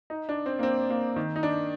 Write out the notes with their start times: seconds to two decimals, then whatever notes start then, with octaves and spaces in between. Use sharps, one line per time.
0.10 D#4
0.29 D4
0.46 C4
0.59 A#3
0.63 C4
0.90 A#3
1.16 D#3
1.36 D#4
1.43 D4